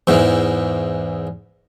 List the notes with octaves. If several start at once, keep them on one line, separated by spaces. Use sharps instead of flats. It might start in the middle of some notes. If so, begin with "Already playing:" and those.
E2 G#2 E3